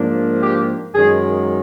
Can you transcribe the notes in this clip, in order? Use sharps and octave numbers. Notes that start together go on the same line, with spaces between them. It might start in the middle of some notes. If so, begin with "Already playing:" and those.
Already playing: G#2 F3 A#3 D4
G4
F#2 D#3 G#3 G#4